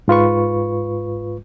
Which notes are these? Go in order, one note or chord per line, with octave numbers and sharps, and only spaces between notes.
G#2 F4 B4 C#6